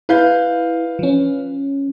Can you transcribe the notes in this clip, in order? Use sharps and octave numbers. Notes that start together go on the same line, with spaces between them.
E4 B4 F5 G6
F3 C#4